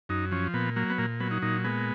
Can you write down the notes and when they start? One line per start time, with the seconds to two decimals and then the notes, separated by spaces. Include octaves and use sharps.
0.09 F#2 D#4
0.31 F3 C#4
0.54 A#2 B3
0.76 F#3 A#3
0.90 B3
0.98 A#2 A#3
1.20 F#3 B3
1.31 D#4
1.42 A#2 D#4
1.64 G#3 B3